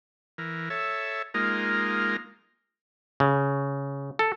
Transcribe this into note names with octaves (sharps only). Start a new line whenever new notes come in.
E3 A#4
A4 C#5 E5
G#3 A#3 D#4 F4 A#4
C#3
A4